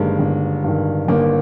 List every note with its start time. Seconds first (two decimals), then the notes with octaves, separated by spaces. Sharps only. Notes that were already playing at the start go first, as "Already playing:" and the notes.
Already playing: G1 G2 D#3 G#3 A#3
0.19 G1
0.64 G2 D#3
1.08 G1 A#3